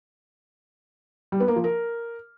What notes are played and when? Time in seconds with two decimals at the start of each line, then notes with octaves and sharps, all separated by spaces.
1.32 G3
1.40 B3
1.48 A#3
1.56 F3
1.64 A#4